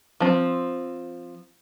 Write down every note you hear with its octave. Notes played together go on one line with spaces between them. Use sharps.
F3 C4